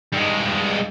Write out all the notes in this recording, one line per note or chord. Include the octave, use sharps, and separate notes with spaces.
G2 G#3